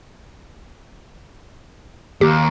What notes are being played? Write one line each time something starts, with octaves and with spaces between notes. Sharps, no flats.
D#2 G4